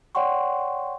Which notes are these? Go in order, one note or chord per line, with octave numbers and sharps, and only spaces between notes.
C#5 D5 F#5 G5 C6 C#6